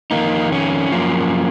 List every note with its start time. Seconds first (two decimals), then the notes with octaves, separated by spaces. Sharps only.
0.11 F2 D#3 A#3 D#4
0.52 C#4
0.92 F#2 F3 A#3